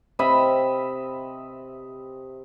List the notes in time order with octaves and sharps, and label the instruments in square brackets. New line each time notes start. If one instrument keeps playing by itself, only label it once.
[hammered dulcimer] C3 D#5 E5 B5